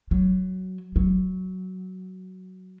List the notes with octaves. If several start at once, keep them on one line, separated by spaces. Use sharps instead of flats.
F#3
F#3